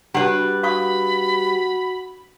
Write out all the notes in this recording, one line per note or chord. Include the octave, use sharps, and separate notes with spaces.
G3 D4 F#4 G4 B4 F#5
F#4 F5 B5 C#6 D#6